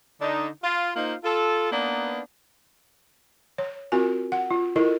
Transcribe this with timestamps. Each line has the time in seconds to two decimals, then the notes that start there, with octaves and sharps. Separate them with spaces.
0.21 D3 D4 D#4
0.63 F4
0.95 A#3 D#4 F4 C5 F5
1.24 F4 A4
1.71 A#3 B3 D4 D#4 B4
3.58 C#5
3.92 C4 F4 F#4 A#4 G#5
4.32 F#5
4.50 F4
4.76 E4 F4 A4 A#4 D#5